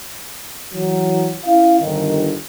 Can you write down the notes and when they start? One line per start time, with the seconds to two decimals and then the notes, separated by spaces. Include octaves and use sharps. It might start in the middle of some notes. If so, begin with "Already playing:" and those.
0.73 E3 F#3
1.46 C#4 E4 F5
1.80 G1 D#3